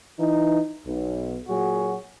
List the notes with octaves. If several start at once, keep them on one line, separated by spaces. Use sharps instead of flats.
E3 D#4
B1
A#2 F#3 F#4 G#4